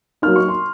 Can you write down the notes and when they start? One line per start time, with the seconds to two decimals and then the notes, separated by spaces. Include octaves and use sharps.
0.22 F#3 A#3 D#4 F6
0.36 C#6
0.48 C6